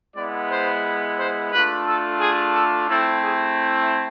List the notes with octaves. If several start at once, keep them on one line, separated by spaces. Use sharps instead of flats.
G#3 B3 E4 D5
C5
C5
A3 D4 F4 B4
A4
G#4
A4
A3 C4 E4 A4
G#4